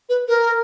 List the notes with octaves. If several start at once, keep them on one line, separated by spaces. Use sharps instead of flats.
B4
A#4